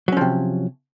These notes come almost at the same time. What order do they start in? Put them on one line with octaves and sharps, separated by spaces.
F#3 C#4 F3 C3